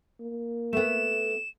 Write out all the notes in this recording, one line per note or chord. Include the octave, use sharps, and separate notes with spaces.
A#3
A3 B3 E7